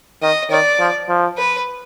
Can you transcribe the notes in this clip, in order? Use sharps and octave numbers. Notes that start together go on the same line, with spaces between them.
D#3 D#5
D#3 D5
F3
F3
B4